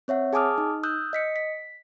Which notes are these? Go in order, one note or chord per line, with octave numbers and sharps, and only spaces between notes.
C4 C#5 E5 F#5
G#4 G#5 A5 D6 D#6 F6
D#4
D#6 E6 F#6 G6
D#5 B6 C#7
B6